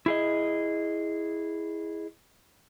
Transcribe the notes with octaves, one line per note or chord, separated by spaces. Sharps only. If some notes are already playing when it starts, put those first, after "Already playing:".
E4 G#4 D#5